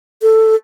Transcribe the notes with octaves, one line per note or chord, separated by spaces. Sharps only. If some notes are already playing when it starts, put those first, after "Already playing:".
A4